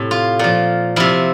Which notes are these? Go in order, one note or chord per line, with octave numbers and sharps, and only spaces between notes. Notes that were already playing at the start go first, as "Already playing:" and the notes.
Already playing: A2 C3
F4
A#2 F3
C3 F3 E4